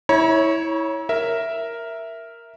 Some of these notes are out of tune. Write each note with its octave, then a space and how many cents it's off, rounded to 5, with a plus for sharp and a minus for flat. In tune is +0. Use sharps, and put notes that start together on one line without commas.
E4 -20 C#5 +0 A#5 +45
A#4 +0 E5 +0